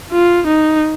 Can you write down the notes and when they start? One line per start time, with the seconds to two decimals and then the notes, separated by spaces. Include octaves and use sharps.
0.12 F4
0.47 D#4